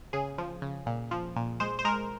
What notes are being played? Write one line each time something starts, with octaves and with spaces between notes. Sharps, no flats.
C#3 G#4
F3
C#3
A#2
F3
A#2
G#3 C5
C5
G#3 A#4